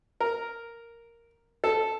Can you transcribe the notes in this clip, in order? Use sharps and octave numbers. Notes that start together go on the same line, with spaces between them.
A#4
A4